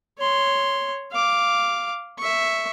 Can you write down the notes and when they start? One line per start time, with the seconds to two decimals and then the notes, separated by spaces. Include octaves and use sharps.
0.18 C#5 C6
1.12 F5 D6
2.18 E5 C#6